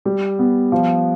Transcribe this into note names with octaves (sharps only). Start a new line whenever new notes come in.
G3
B3
F3